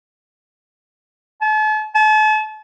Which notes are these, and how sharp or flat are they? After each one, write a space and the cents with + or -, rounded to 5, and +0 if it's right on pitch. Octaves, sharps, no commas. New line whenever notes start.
A5 -40
A5 -40